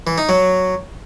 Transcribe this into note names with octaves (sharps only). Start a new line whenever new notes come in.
E3
D#4
F#3